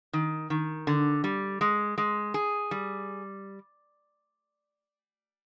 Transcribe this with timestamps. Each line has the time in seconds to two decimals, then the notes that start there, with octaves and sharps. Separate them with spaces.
0.13 D#3
0.50 D#3
0.87 D3
1.24 G3
1.61 G#3
1.98 G#3
2.34 G#4
2.71 G3